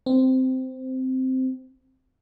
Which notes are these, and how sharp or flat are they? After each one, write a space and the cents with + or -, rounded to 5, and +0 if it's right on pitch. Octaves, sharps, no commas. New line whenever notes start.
C4 -10